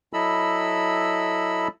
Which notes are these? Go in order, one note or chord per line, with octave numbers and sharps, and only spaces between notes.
F#3 E4 A4 D#5 B5 E6